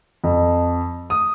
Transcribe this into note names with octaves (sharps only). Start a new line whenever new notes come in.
F2
D#6